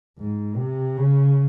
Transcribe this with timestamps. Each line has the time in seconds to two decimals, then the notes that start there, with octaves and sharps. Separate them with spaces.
0.18 G#2
0.57 C3
0.97 C#3